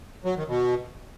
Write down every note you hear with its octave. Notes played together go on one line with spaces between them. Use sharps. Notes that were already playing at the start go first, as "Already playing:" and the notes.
F#3
D#3
B2